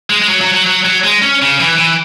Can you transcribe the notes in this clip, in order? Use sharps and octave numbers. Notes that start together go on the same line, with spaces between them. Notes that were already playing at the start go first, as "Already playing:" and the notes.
G#3
G#3
F#3
F#3
F#3
F#3
F#3
G#3
C#4
C#3
E3
E3